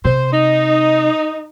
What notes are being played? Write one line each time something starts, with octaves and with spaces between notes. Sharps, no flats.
C3 C5
D#4